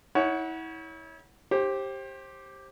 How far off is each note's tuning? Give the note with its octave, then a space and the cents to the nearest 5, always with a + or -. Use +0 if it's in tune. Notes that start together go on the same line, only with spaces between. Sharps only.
E4 -35 C#5 +10 F#5 +0
G4 +0 C5 +30